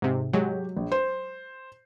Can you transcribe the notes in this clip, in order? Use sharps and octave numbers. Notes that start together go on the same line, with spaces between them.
G#2 C3
F#3 G#3 G4
A#1
C5